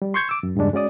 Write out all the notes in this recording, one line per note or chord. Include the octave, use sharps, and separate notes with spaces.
G3
C6 C#6 G6 G#6
D6 E6
F#2
E2 G2 C#3 G#3 D4
G#3 C#4 F#4 D5 D#6